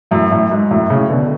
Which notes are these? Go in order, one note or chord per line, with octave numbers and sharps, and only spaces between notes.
F#2 A2
F#2 A2
G#2
F#2 A2
A2 C#3
B2 D3